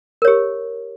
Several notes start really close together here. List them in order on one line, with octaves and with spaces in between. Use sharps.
A#4 C#5 G4